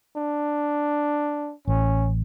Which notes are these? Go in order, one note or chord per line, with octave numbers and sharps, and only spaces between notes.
D4
A1 C#4